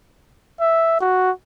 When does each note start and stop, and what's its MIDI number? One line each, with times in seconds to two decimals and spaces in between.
0.60 0.96 76
1.00 1.30 66